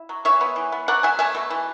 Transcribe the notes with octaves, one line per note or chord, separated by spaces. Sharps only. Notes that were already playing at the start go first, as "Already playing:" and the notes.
Already playing: E4
F#3
E3 C#5 E5
B3
E3
B3
F#3 D5 F#5
B2 E5 G#5
A3 E5 G#5
B2
E3